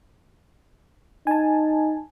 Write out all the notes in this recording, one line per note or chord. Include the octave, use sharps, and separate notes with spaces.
D#4 G#5 A5